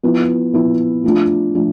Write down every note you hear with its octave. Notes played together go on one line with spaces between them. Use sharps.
F3 B3 E4
F3 B3 E4
F3 A3 D4 F4
F3 A3 D4 F4